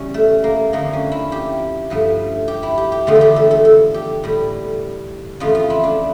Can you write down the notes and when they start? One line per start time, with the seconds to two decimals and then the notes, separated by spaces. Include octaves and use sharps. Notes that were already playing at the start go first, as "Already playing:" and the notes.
Already playing: E2 C#3 G3 C#4
0.14 A3
0.44 A#3
0.73 F2 D3 A3 A#3
0.93 C#4
1.12 E4
1.32 G4
1.90 G2 F3 A3
2.48 G4
2.63 E4
2.78 G4
2.92 G4
3.07 E2 D3 F3 A3 F4
3.15 A4
3.21 G4
3.36 A4
3.51 A4
3.65 A4
3.94 G4
4.24 A2 G3
5.40 F2 C#3 E3 A3 F4
5.55 F4
5.70 E4
5.84 D4